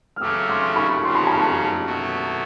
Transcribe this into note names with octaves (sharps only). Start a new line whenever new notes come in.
F6
C#3 F#3 A3 D6 E6
C6 D6
B5 C#6
F2 C#3 F#3 C6
B5
A#5
A5 B5
B2 F#3 A3